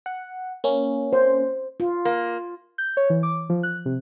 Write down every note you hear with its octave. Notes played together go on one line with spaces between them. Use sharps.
F#5
A#3 C#4
C5
F4
A#3
G6
C#5
E3
D6
F3
F#6
C3